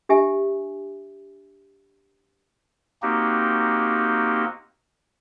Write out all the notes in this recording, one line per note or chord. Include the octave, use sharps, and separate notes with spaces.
D4 G4 E5 G#5
A#3 C4 D#4 F#4 G4